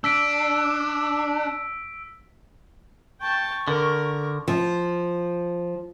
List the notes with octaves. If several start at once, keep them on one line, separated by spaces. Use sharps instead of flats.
D4 E6 B6 D7
G5 A5 C#6
D3 A#4
F3